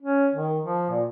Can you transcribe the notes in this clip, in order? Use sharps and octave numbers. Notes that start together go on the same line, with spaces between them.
C#4
D#3
F3
A#2